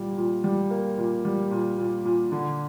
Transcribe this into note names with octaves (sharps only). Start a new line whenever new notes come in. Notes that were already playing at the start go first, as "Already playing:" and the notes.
Already playing: A#2 G3
A#2
G3
A#3
A#2
G3
A#2
A#2
A#2
D3